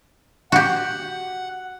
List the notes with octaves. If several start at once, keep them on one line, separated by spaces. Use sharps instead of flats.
F#4 G4 F#5